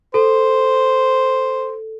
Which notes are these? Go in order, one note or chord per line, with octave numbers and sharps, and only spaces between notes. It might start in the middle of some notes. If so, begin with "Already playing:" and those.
A4 C5